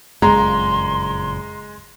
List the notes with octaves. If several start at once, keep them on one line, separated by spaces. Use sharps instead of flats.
F#1 F2 A#2 G#3 A#5 C6